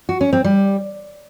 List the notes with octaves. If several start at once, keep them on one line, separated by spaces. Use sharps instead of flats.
F#4
C#4
C4
G3